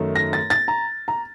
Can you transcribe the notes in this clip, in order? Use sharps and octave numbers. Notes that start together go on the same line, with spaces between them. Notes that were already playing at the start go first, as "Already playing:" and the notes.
Already playing: F#2 D#3 A3 D#4
A#6
A6
A6
A#5
A#5